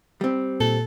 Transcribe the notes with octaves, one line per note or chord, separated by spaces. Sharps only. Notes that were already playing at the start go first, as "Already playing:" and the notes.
G3 C4
A#2 A4